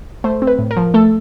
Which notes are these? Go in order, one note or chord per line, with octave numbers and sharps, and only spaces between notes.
A3 C5
C4
B4
A2
A#4
F3
A3 A4